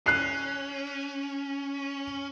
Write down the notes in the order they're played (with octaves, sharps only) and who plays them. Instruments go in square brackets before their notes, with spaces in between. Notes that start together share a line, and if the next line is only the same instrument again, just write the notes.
[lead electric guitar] C#4 [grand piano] F#6 C7